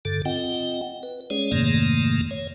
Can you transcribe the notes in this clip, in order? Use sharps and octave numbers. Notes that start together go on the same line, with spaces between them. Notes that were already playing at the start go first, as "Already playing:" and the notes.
G2 D3 A4
C4 F4 D#5 F#5 G5
B4
G#3 C#4 G#4 C#5 D5
F2 G#2 C3 D#3 A3 A#3
C#5